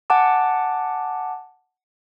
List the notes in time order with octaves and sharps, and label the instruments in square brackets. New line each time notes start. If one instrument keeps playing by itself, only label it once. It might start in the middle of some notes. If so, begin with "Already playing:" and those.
[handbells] F#5 G#5 A5 D6